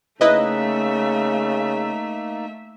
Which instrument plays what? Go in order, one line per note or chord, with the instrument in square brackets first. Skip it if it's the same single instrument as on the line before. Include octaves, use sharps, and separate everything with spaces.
[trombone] C#3 [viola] A3 E5 [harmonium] A#3 D#4 [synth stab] E4 B4 D#5